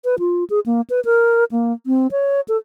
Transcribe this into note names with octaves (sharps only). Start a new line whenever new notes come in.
B4
F4
G#4
A#3
B4
A#4
A#3
C4
C#5
A4